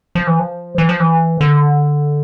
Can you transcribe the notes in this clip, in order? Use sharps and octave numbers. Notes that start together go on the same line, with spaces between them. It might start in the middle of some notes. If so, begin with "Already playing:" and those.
F3
E3
F3
E3
F3
E3
D3